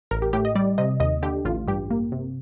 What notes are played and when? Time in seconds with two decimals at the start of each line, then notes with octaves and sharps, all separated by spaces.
0.11 A1 A#4
0.22 G4
0.33 A2 G4
0.45 D#5
0.55 G3 D5
0.78 C3 D#5
1.00 D#2 D#5
1.23 D3 G4
1.45 A1 F4
1.68 G2 G4
1.90 A#3
2.12 C3